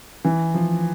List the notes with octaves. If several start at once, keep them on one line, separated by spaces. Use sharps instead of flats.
E3
F3